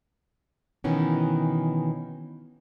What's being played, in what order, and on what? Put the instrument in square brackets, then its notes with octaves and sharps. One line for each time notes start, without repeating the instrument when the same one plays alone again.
[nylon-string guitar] B2 D#3 E3 B3 C#4